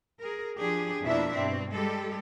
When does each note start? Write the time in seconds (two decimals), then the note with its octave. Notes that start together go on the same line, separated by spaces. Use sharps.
0.21 G#4 A#4
0.57 F3 D4 G4 G#4
1.03 F2 B2 A#3 D4 E4 E5
1.36 G2 B2 C4
1.72 G3 G#3 G4 A4